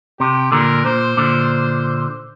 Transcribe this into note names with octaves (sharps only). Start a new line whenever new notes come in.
C3 G4
A#2 D3 A#4
A#2 C5
A#2 D3